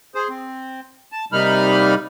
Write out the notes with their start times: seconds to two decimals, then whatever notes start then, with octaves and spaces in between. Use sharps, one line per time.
0.15 G#4 C5
0.29 C4
1.12 A5
1.32 C3 G3 A#3 D#4 B5 F6